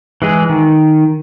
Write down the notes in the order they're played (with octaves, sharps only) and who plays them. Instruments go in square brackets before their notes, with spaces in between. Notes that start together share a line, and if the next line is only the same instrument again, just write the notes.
[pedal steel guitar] E3 G#3 G#4
D#3